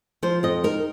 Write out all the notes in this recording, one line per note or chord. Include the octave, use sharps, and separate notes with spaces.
F3 C5
F2 D#5
D#4 A#4